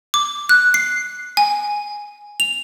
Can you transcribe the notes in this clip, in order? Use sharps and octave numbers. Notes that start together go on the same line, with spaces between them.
D6
F#6
C7
G#5
F7